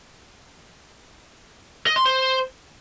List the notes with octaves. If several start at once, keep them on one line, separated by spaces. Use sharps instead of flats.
D#5
C6
C5